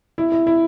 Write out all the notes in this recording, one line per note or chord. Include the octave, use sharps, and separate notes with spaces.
E4
E4
E4